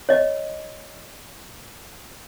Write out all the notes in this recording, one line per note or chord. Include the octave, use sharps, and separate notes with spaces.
C#5 D#5